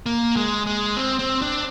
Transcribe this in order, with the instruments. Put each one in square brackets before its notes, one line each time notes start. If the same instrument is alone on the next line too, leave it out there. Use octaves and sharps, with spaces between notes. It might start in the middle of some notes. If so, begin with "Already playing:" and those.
[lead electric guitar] A#3
G#3
G#3
C4
C4
D4